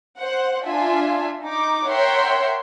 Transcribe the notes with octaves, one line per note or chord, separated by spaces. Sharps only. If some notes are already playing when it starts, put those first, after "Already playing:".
C5 F#5
D4 F4 E5 G#5
D#4 D6
A#4 C#5 E5 F#5 G5 C6